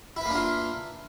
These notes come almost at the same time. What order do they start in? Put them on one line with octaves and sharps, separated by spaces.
E4 B4 A#3 D4 F4